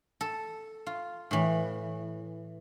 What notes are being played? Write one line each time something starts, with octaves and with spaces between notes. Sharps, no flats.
A4
F4
A2 E3